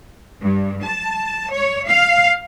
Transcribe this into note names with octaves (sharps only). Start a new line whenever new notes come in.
G2
A5
C#5
F5